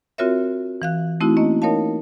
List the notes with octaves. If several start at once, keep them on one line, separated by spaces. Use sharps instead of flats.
C4 F4 F#4 A#4 C#5 E5
E3 F5 F#6
A3 C4 D#4 E4 F#4
A#3 C#4 D#5
D#4 A#4 C#5 D#5 F5 A5